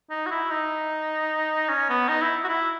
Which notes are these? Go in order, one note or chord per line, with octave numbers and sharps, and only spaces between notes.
D#4
F#4
E4
D#4
C#4
B3
D#4
E4
F#4
E4